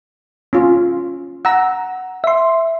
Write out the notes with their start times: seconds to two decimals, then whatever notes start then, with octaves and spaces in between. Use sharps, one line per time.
0.53 C#4 F4
1.45 F#5 A#5 E6
2.24 E5 C6